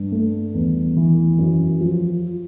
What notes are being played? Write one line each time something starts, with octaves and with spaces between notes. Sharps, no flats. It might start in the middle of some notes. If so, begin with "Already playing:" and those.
Already playing: G2
A3
E2
E3
F#2
F3